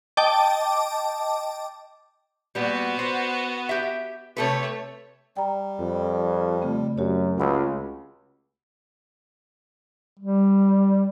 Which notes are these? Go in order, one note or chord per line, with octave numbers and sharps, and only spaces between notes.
D#5 G5 A5 D6
A#2 G3 B3 F#4
C5
G4 E5
C3 A3 A4 B4 C#5
G3 G5 A#5
F2
C#3 A3 C4
F#2 F#4 G4 C#5
C#2 F#5 B5 E6
G3